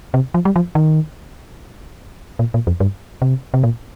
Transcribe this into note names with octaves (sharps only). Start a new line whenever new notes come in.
C3
F3
G3
F3
D#3
A#2
A#2
F2
G2
C3
C3
A#2